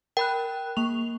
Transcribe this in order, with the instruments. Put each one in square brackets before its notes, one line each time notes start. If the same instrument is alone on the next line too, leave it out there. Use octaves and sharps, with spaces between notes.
[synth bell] A#4 B5 F#6 [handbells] G5
[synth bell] A#3 C#6 F7